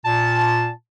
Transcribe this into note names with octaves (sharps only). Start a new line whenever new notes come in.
A#2 A5